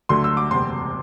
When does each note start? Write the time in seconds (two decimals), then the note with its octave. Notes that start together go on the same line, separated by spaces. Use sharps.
0.09 D2 D3 F#3 A3 C6
0.24 E6
0.37 D6
0.51 F#1 E2 C3 G3 C4 C6